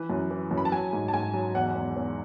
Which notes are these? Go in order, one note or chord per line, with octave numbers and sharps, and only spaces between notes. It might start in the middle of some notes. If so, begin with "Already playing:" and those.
Already playing: E3 B4
F#2
E3
F#2
B5
A5
F#3 G#5
G#2
A5
G#2 G#5
F#3
E2 F#5
E2
E2